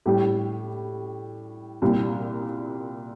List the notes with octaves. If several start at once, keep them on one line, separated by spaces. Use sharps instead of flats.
A2 G3 G4
C2 A#2 G3